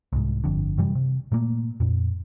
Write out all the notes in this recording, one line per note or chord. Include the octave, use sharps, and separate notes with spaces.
C2 G#2
G1 F2 D3
F#2 C3 E3 G3
C3
A#2 A3 A#3
F2 A#2